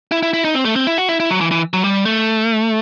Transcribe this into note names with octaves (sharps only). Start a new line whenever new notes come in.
E4
E4
E4
D#4
C4
A3
C4
E4
F#4
E4
E4
F#3
E3
E3
F#3
G3
A3